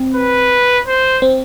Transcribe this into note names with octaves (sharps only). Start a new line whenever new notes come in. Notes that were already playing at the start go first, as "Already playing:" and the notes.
Already playing: C4
B4
C5
C4